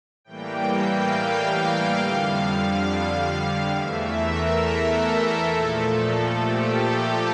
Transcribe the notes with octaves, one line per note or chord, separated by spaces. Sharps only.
A2 E3 G3 A#3 G5
G5
F5
G5
F5
F2 D3 G3 F5
E2 E3 A3 E5
A#4
A4
A#2 F3 A3
G4
A4